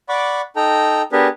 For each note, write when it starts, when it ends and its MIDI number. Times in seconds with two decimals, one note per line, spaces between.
0.09 0.41 74
0.09 0.41 78
0.09 0.41 83
0.09 0.41 85
0.09 0.41 86
0.56 1.02 63
0.56 1.02 69
0.56 1.02 79
0.56 1.02 82
1.12 1.28 59
1.12 1.28 62
1.12 1.28 67
1.12 1.28 68
1.12 1.28 70
1.12 1.28 71